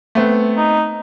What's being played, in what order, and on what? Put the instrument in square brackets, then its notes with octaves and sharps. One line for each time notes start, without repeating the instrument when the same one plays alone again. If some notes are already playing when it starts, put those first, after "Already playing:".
[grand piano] A3 B3 C4
[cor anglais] D#4